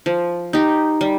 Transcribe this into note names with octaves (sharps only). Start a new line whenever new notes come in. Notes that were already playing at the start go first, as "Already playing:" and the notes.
F3
D#4 G4
G3